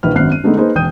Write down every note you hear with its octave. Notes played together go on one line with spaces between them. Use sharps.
A#1 D#3 E3 B4 F6
G#1 F#2 B3 F6 F#6 C7
D#7
D3 G#3 A3 B3 D#4
A#3 D#4 G#4 B4 C5
E1 G5 D#6 G6 D#7